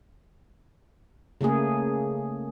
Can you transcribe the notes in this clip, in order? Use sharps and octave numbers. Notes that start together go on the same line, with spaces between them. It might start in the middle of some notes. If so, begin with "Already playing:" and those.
C#3 A3 A#3 G#4